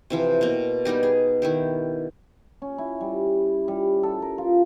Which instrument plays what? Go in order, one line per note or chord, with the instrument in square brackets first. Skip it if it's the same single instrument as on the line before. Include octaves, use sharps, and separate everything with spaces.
[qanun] C3 E3 F3
B2 A#3
G3 B3 D#4 G4
G#4
D#3 E4 G4
[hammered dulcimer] C#4
E4
G3
G3
A4
A#4
F4